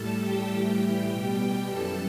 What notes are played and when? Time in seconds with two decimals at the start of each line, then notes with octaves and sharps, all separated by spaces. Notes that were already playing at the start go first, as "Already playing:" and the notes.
Already playing: A2 G3 A4 A5
0.19 G4 G5
0.48 A2 E3 G3
0.78 G4 G5
1.08 B2 G3
1.37 G4 G5
1.67 F#2 E3 G3 A4 A5